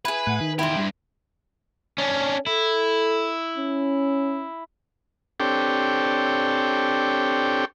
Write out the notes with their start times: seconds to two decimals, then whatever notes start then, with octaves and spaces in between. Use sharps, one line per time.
0.05 E4 G#4 B4
0.27 A2 F#5
0.41 D#3
0.59 E2 E4 G4 C5
0.77 G2
1.98 C#4 D4
2.46 E4 A4
3.57 C#4
5.40 C4 D4 G4 A4 C#5 G5